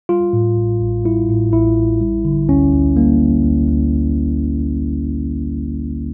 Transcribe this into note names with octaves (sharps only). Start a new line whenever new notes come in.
G3 F4
A2
A1
A1
G3 E4
A2
A1 E4
A1
G3
D3
D2 C#4
D2
G3 A#3
D3
D2
D2